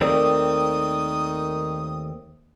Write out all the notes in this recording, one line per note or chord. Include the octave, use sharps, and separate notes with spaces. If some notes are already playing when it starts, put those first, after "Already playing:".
D#2 D#3 A3 C4 A#4 D5 D#6